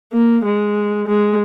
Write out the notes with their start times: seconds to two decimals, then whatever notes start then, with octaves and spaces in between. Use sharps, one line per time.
0.13 A#3
0.45 G#3
1.07 G#3